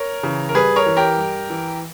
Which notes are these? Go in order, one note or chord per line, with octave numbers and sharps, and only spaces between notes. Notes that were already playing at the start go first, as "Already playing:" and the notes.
Already playing: A#4 C#5
C#3 E3
A#4
G2 G#4 B4
A#4 C#5
E3
G4 A#4
G2
E3